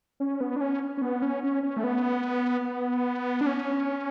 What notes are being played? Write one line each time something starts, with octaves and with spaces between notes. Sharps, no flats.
C#4
B3
D4
C#4
C#4
B3
C#4
C#4
C#4
A3
B3
B3
D4
C#4